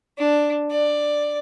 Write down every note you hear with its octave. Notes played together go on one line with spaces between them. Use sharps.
D4
D5